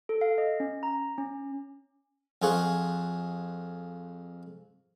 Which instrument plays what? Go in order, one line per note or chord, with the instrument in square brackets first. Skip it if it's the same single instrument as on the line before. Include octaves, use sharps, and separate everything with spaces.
[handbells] A4
F5
D#5
C#4
A#5
C#4
[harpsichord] F2 F4 G#4 F#5 C#6